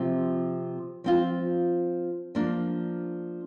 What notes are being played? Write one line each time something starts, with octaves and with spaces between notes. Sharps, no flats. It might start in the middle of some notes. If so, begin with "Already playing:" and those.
Already playing: C3 F3 C4
F3 C4 F4
F3 A#3 D4